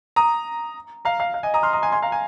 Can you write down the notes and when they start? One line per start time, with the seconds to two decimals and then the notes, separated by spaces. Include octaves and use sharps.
0.16 A#5 D#6
1.05 F5 A#5
1.20 F5
1.34 F5
1.43 D#5 G#5
1.54 A#5 D#6
1.63 C6 F6
1.73 A#5 D#6
1.82 G#5 C6
1.92 G#5 C6
2.02 F5 A#5
2.12 G#5